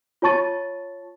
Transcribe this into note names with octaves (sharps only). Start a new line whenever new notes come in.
F4 C#5 A5 C#6 A6 D#7